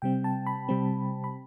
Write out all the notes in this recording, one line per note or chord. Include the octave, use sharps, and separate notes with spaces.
C3 G3 C4 G5
A5
B5
C3 G3 C4
B5